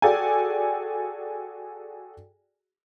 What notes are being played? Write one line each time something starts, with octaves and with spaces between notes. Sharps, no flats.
F#4 G#4 A4 D5 G5 G#5